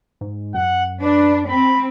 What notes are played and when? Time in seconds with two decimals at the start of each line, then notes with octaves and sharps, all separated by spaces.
0.21 G#2
0.54 F#2 F#5
1.02 D4 B4
1.48 C4 B5